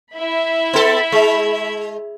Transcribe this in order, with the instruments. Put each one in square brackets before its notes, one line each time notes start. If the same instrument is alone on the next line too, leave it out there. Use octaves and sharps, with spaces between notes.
[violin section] E4 E5 B5
[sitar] B3 A4
G#3